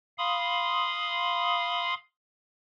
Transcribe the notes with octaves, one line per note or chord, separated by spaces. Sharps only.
F5 B5 C6 D#6